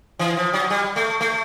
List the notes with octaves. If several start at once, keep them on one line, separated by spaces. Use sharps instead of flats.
E3
F3
F#3
G3
A3
A3